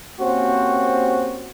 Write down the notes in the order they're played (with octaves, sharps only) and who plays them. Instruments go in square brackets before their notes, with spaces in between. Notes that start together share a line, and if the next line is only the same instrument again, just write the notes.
[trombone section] A#3 C4 C#4 F#4 G4 C5